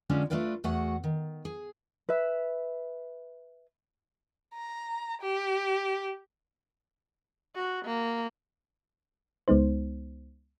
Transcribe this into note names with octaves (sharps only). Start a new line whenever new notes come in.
D3 F3 G#3 B3 C#4 D4
A3 B3 D4 F4 B4 D5
E2 A3 F#4 G#4 F#5
D#3
G#4
B4 E5
A#5
G4
F#4
A#3
C#2 G#3 B3 D#4 C5